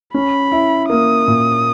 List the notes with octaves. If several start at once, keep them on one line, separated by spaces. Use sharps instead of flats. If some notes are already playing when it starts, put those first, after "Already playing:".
C#4 B5
E4
A#3 D#6
A#2